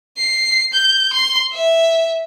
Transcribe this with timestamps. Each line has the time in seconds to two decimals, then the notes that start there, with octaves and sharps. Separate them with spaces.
0.17 C7
0.73 G6
1.13 C6
1.52 E5